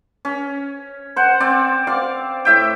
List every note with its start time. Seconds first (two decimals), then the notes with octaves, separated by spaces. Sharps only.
0.25 C#4
1.16 C5 F#5
1.40 C4 D5
1.87 D5 F5
2.45 A2 E5 G5